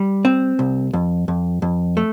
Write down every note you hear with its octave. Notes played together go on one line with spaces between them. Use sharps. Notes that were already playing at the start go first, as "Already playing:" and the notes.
Already playing: G3
C4
C2
F2
F2
F2
A3